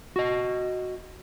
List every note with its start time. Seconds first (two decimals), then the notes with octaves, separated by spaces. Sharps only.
0.16 F#4 D#5